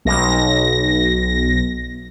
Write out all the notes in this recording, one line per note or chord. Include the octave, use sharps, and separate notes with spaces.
B1 A#6